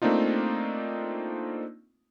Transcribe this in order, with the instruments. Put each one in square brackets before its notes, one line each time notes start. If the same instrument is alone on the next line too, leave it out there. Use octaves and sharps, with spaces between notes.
[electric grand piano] A3 A#3 C4 D4 D#4 F4